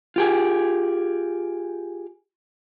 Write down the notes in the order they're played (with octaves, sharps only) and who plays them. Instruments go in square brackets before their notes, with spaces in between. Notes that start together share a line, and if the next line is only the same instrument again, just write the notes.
[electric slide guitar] F4 G4 G#4